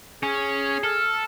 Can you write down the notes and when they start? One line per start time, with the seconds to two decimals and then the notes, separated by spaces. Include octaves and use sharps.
0.23 C#4 G#4
0.84 A4 F6